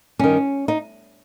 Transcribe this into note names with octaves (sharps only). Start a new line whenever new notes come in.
G2 D#3 C#4
D#4